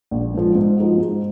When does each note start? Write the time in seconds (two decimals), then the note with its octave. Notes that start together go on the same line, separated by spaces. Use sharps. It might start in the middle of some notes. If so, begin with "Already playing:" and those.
0.11 A#1
0.34 G#2 F3
0.55 G#2
0.77 F3 G#3 D#4 F#4
0.98 G#2